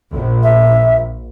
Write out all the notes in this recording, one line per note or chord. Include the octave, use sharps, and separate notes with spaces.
A#1
E5